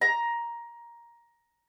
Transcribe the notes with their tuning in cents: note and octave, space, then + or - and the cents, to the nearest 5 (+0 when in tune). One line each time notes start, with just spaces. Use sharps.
A#5 +10